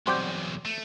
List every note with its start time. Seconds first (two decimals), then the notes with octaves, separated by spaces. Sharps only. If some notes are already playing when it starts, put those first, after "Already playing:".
0.07 B1 E2 G3 C4 F#4 C6 D6 G6
0.65 A3